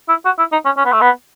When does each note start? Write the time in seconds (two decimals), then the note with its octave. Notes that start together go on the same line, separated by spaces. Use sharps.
0.09 E4
0.25 F#4
0.38 E4
0.52 D#4
0.65 C#4
0.77 C#4
0.85 B3
0.92 A3
1.01 B3